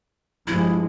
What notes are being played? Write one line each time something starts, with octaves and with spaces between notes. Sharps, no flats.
G2 F3 G#3 E4